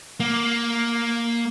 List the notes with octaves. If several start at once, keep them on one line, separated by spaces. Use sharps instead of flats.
A#3